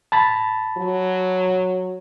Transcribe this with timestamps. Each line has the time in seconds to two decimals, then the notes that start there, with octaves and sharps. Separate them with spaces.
0.12 A5 B5 A6
0.77 F#3